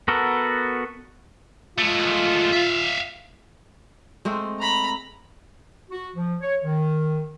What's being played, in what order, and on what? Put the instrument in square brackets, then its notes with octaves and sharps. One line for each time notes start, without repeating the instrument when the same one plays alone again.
[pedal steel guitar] B3 F#4 A4 A#4
[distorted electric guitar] G#3 A3 [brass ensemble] F4
[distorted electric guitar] E5 F5
[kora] G#3 A3 C4
[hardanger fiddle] A#5 B5
[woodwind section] F#4
F3
C#5
D#3